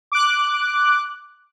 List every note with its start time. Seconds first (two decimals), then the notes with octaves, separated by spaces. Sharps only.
0.12 D6 F#6